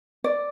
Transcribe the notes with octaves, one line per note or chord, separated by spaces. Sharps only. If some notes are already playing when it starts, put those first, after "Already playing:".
D5